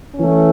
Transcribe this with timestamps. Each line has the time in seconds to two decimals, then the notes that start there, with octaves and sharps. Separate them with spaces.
0.16 E3 A3 C#4